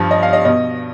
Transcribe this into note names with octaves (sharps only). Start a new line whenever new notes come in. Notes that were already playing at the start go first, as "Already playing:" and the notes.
Already playing: G2 F3
D#5
F5
D#5
B2 D#5